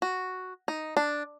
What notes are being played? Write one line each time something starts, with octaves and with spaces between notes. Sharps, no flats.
F#4
D#4
D4